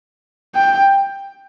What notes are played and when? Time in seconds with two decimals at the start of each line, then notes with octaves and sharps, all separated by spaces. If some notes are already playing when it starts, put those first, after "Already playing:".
0.56 G5